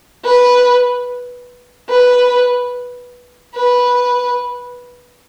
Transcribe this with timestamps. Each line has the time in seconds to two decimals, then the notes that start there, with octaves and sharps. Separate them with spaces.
0.24 B4
1.89 B4
3.56 B4